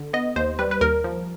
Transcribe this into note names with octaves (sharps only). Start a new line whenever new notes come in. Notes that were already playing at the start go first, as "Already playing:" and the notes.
Already playing: D3
B3 D#5
D#2 C5
G3 B4
B4
D#2 A#4
F3